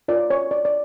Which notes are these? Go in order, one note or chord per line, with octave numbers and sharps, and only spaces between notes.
F4 A#4 C#5 D5
C#5
D5
D5